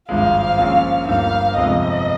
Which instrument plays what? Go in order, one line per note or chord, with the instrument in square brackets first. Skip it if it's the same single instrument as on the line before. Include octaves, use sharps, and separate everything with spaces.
[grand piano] G#1 G2 F3 G#3 [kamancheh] F5
[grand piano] A#1 A#2 F3 G#3 C#4
[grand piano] G1 G2 F3 A#3 D#4 [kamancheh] F5
[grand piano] G1 F2 C3 F3 G#3 [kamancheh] D#5